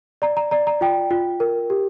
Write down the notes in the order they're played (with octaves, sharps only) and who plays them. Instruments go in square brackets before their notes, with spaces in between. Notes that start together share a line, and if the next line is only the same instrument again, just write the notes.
[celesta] D5 A#5
A#5
D5 A#5
A#5
F4 G5
F4
A#4
G4